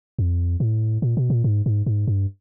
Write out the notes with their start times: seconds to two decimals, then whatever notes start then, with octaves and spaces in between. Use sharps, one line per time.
0.19 F2
0.60 A2
1.02 A#2
1.17 B2
1.30 A#2
1.44 G#2
1.66 G#2
1.86 G#2
2.07 G2